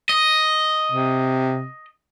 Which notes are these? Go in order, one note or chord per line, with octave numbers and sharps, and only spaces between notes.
D#5
C3